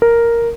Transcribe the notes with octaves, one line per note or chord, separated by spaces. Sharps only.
A#4